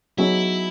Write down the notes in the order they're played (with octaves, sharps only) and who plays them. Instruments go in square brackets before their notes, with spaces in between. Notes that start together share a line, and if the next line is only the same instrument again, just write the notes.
[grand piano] F#3 B3 D#4 G#4 C#5 [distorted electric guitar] E4